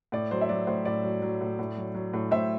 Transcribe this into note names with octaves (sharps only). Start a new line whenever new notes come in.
A2 D5
F#3 C5
E5
F#3 D5
A2 C5
A2 D5
F#3
F#3
A2
A2
F#3
F#3
A2
A2 C5 E5